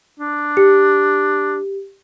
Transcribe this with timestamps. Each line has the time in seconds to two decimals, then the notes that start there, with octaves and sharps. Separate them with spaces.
0.20 D4
0.57 G4